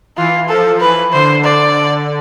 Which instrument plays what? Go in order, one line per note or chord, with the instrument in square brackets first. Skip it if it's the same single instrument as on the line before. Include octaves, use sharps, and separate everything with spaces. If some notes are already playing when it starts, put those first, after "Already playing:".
[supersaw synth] E3 [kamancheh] F4
[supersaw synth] F3 [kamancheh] A4
[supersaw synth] E3 [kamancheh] B4
[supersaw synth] D3 [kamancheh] C5
[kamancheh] D5